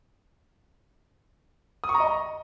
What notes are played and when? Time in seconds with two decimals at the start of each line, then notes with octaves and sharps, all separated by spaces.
1.84 D#6
1.89 C#6
1.95 A#5
2.00 D#5